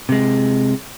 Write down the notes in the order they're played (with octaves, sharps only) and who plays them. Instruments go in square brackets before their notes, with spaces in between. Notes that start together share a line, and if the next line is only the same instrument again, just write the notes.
[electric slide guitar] C3 G#3